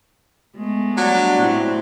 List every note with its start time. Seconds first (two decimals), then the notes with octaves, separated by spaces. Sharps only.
0.56 G#3 A3 B3
0.96 F#3 G3 D4
1.37 A2 C4 E4